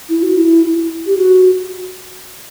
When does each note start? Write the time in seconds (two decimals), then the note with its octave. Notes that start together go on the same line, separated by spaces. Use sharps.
0.09 E4
0.23 F#4
0.36 E4
1.06 G4
1.17 F#4